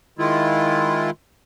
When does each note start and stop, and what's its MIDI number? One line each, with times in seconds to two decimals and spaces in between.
0.19 1.10 51
0.19 1.10 56
0.19 1.10 64
0.19 1.10 65